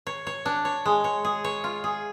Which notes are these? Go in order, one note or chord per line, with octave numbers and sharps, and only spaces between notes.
C#5
C#5
D4
C#5
G#3
C#5
G#4
C#5
F4
G#4